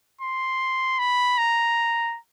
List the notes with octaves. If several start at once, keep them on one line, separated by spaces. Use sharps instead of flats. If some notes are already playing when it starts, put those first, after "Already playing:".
C6
B5
A#5